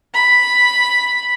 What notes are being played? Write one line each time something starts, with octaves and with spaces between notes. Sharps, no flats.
B5